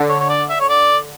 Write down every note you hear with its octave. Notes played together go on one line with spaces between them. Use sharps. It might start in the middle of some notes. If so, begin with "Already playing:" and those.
Already playing: D3
C#5
C#5
D5
E5
C#5
D5